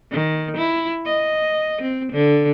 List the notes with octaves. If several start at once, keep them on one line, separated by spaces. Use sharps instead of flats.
D#3
E4
D#5
C4
D3